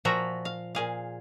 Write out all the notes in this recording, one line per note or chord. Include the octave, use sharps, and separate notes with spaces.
A#2 F3 F4 F#4 E5 A#5
F5
A#2 G#4 F5